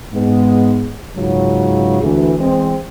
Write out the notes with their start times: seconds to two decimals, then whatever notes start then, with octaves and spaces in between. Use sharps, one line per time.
0.13 G#2 G#3 B3
1.16 C#2 G#2 C#3 F#3
2.02 D2 E3
2.39 E3 G#3 C4